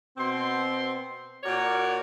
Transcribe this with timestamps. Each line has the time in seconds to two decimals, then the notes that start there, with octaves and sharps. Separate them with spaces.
0.17 B2 C4 C6
1.43 A#2 F#4 A#4 C#5 D5